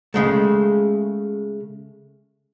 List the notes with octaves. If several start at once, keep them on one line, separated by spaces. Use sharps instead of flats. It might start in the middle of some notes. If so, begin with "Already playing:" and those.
C#3 G#3 A3